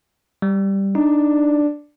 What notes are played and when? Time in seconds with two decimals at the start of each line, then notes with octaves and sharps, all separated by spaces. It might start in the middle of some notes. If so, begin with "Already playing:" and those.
0.42 G3
0.95 D4 D#4